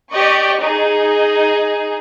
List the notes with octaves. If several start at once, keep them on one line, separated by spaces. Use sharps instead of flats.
G4 D5 D#5 C#6
D#4 G#4